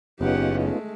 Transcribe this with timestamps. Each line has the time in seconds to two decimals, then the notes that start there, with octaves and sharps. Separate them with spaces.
0.21 F#1 E2 B3 C#4 D#4 F4 G4 F#5
0.61 G#3 A3